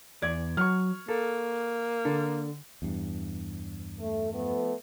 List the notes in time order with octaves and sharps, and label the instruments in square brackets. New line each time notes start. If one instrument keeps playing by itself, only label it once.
[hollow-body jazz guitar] E2 D5 [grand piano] G#6
[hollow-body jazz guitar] F#3 [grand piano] C#6 F6
[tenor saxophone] A#3 [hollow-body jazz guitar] A4
[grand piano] D3 [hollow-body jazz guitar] A4
[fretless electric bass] E2 G2
[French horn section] A3
F3 A3 B3